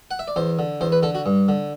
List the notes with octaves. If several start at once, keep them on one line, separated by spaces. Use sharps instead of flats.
F#5
E5
D5
E2 C5
D3
E2 C5
B4
D3 A4
F#4
G2
D3